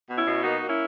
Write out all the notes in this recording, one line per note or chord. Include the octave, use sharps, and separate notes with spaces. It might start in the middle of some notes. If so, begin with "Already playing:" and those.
B2
C#4 E4
B2
A#3 D#4 F#4
A#3
C#4 E4